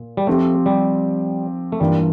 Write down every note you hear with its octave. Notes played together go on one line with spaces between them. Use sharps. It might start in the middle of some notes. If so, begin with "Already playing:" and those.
Already playing: A#2
G3
F3 A3 C4 G4
G3
A3
G2 E3 G3 A#3 F4